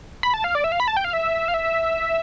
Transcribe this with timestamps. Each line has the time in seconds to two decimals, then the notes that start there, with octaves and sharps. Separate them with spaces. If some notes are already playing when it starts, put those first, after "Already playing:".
0.23 B5
0.34 A5
0.44 F5
0.55 D5
0.64 E5
0.72 F5
0.80 B5
0.88 A5
0.97 G5
1.04 F5
1.13 E5
1.48 F5
1.54 E5